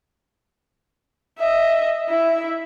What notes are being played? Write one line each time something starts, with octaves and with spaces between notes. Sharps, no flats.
D#5 E5
E4 E5